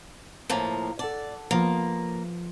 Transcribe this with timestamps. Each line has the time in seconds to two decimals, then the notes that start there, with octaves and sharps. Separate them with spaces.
0.49 A2 F3 A#3
0.99 A4 D5 F#5 A5
1.51 F3 A#3 B3 F4